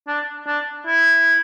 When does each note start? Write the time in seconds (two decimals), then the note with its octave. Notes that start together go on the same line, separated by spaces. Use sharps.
0.08 D4
0.47 D4
0.87 E4